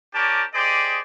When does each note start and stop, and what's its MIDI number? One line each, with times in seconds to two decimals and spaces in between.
0.14 0.44 61
0.14 0.44 67
0.14 0.44 70
0.14 0.44 74
0.14 0.44 81
0.53 0.98 67
0.53 0.98 68
0.53 0.98 72
0.53 0.98 74
0.53 0.98 75